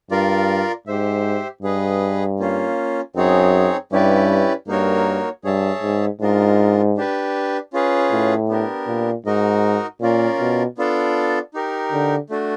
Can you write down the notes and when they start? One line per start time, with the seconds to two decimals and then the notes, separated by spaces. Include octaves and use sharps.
0.11 G2 F4 A#4 D5
0.87 G#2 G4 C5 E5
1.63 G2 G#4 B4 D#5
2.39 A#3 C#4 F4
3.16 F#2 C4 D#4 G#4 C#5
3.92 G2 C#4 E4 G4 B4 D5
4.67 G2 A#3 D#4 F#4 A#4 C#5
5.44 G2 G#4 C#5 E5 A5
5.82 G#2
6.21 G#2 D4 F4 A#4 D#5
6.97 D4 G4 B4
7.73 C#4 F4 G#4 B4
8.11 A2
8.49 B3 D4 G4 A#4
8.88 A#2
9.26 G#2 D#4 F#4 A#4 D#5
10.01 A#2 C#4 F4 A#4 D5
10.40 B2
10.78 B3 D4 F4 A4 D5
11.54 D#4 G4 A#4
11.92 D3
12.30 A3 D4 F#4